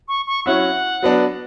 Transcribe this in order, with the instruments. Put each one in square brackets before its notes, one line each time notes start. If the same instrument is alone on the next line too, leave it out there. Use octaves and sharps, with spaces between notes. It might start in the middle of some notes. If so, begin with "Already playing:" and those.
[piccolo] C#6
C#6
[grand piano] F#3 C#4 E4 [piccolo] F#5
[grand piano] F#3 B3 D4